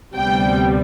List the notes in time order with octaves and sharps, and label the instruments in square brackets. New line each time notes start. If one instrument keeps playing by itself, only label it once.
[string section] D2 C3 G3 B3 G5